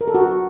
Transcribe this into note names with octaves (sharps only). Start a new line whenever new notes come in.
A#4
A4
F#4